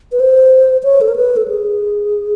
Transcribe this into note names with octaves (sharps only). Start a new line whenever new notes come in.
B4
C5
C#5
A4
A#4
B4
A4
G#4